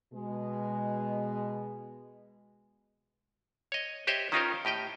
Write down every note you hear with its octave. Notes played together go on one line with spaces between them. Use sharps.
B2 G#3
C#5 D#5
G4 C5 C#5 D#5 E5
D#3 C#4 D#4 F4 A#4 C5
A2 G4 D#5 G5